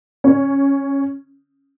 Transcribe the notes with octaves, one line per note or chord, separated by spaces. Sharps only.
C#4